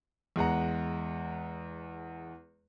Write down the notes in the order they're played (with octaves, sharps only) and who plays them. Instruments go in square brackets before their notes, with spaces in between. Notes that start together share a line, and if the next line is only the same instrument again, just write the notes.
[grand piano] E2 G#3 F#5 A#5